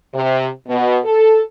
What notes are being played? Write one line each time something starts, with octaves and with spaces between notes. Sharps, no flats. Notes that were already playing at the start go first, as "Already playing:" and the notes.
C3
B2
A4